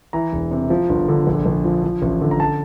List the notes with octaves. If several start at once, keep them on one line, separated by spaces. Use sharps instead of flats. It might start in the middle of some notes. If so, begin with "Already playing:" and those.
E3 A#5
E1
C3
F3
G1
D3
A#1
A#1
F3
F3
A1
D3
A#5
A5